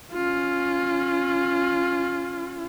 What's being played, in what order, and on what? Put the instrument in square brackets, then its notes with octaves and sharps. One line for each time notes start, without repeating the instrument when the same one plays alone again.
[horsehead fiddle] C#4 F4